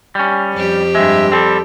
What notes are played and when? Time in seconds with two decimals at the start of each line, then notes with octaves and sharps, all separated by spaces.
0.15 G3 C#4
0.54 F2 G4
0.95 G2 G#3 E5
1.32 G3 C4 A4